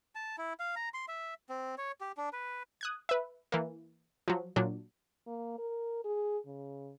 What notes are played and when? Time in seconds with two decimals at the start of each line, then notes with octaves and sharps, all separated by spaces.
0.15 A5
0.38 E4
0.60 F5
0.76 A#5
0.94 C6
1.08 E5
1.49 C4
1.78 C#5
2.01 G4
2.17 D4
2.33 B4
2.81 D#6 F#6 G#6
3.09 B4 E5
3.52 E3 A#3
4.28 F3 F#3
4.56 A#2 F#3 D4
5.27 A#3
5.58 A#4
6.05 G#4
6.46 C#3